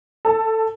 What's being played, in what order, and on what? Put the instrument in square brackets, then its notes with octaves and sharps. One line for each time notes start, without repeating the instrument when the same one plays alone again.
[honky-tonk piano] A4